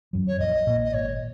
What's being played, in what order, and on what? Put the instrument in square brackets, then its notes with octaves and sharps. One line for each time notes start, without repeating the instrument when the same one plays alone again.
[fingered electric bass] F#2 F#3
[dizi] C#5
[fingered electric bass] A#1 [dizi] D#5
[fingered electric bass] A#2 A#3
[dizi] D#5
[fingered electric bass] G#1 [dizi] C#5